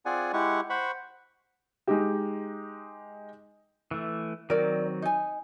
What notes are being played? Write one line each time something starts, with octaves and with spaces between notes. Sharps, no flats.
C4 F4 G#4 D5 F#5 G#5
G#3 E4 G4 F#5 C#6
C5 F#5 B5 C#6
G#3 D#4 G4
E3 A3
D#3 F#3 C4 A#4 D5
D#4 G#5